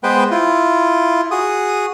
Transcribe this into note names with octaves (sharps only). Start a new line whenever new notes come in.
G#3 B3 B4 C5 G5
E4 F4
F#4 G#4 D#6